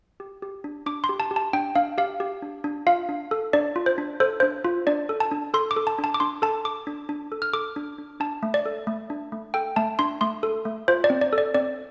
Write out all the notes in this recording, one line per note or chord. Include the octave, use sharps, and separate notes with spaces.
G4
G4
D4
D4 D6
C6
G4
A5
G4
A5
D4 G5
D4 F5
G4 F5
G4
D4
D4
F4 F5
D4
A4
D4 D5
F4
C5
D4
A4 C5
D4 C5
F4
D4 D5
A4
A5
D4
A4 C6
D6
A4
A5
D4
A5
D6
D4 C6
A4 A5
A4 D6
D4
D4
A4
F6
A4 D6
D4
D4
D4 A5
A3
D5
A4
A3
D4
A3
A4 G5
A3 A5
D4 C6
A3 C6
A4
A3
F4 C5
D5
C4
D5
A4
D5
C4 D5